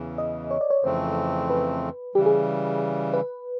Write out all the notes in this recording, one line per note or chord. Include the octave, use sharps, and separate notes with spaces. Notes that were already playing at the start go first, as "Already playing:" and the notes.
Already playing: E2 C#3 E3
D#5
C#5
D5
C#5
F2 C#3 E3 A3 C4 C5
B4
C#3 E3 G3 G4
G#4
B4